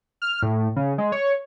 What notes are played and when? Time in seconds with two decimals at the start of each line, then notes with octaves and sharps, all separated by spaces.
0.22 F6
0.43 A2
0.76 C#3
0.98 G#3
1.12 C#5